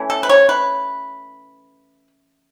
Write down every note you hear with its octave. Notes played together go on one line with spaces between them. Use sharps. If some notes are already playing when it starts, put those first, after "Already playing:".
Already playing: E3 A3 C#4
A4
B4
C#5
B4